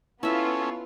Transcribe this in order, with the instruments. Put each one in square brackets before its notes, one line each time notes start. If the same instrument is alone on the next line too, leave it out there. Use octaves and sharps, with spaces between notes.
[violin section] B3 F4 [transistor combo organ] C#4 A4 [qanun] E4 E5